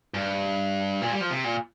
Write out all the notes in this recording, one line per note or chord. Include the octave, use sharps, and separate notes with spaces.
G2
A#2
G3
F3
C3
A#2